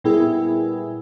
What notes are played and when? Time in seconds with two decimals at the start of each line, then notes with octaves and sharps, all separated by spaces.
0.04 A#2 G3 B3 E4 G#4